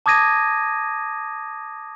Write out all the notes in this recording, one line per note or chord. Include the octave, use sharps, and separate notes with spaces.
A5 D6 D#6 G#6 A#6 D#7